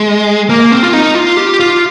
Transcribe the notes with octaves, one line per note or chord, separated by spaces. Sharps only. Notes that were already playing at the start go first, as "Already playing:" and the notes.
Already playing: G#3
A#3
C4
F4
D#4
F4
G4
F4